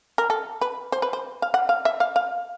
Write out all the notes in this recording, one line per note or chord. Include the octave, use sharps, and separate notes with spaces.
A#4
A4
B4
C5
B4
C5
F5
F#5
F5
E5
F5
F5